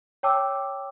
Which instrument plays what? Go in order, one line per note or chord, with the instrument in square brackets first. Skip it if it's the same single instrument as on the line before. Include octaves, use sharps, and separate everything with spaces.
[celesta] C#5 G5 A5 D6 E6